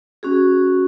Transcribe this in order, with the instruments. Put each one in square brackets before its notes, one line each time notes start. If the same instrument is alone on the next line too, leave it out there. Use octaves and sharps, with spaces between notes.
[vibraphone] C#4 F#4 G#4